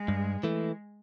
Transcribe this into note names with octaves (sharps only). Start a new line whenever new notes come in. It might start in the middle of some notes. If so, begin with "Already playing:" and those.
Already playing: G#3
G2
E3 A3